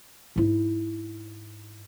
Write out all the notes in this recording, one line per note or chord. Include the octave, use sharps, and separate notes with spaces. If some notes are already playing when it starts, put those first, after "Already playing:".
G#2 E4